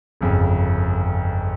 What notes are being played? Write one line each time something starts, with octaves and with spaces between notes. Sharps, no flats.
G1 F2 C#3